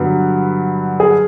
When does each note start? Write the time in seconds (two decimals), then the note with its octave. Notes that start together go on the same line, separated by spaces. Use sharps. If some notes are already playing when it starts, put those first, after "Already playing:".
Already playing: G2 D3 F#3 B3
1.00 G#4